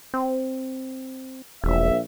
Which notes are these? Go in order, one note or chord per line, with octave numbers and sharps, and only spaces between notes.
C4
E1 A#1 E5